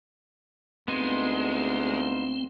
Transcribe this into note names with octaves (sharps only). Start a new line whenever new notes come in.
D2 G#3 B3 C4 D#4 F4